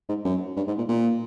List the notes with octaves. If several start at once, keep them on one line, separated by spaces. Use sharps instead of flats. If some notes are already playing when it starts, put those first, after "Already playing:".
G#2
F#2
G2
G#2
A#2
A#2